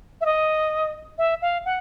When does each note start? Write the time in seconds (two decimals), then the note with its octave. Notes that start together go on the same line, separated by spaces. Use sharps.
0.21 E5
0.26 D#5
1.18 E5
1.42 F5
1.65 F#5